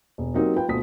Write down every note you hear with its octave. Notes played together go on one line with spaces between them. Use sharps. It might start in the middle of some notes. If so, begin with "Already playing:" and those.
E1
F#3 A#3 C4 D#4 G4
F4 B4 G5
D2 B2 F4 D#6 B6